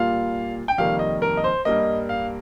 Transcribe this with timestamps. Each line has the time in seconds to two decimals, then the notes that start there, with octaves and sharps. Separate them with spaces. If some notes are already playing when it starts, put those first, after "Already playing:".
Already playing: A#2 G3 A#3 F4 F5
0.68 G5
0.78 F2 C3 D#3 G3 A#3 F5
0.99 D#5
1.22 A#4
1.37 D#5
1.44 C5
1.65 G2 G3 A#3 D#5
2.09 F5